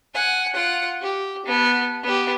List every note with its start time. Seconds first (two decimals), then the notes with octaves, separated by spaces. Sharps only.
0.14 F#5 G#5
0.54 F4 F#5
1.01 G4
1.46 B3 A5
2.03 B3 G4